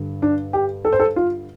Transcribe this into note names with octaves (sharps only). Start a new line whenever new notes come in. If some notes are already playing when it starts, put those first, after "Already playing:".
Already playing: G2 D3
D4
G4
A4
C5
A4
F4